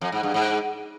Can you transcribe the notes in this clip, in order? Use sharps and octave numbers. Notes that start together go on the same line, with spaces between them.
F2
G#2
G2
G#2